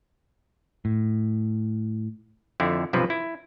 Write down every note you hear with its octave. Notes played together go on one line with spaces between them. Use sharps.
A2
F2 D3 C4 E4
B1 G2 C3 F3 B4
E4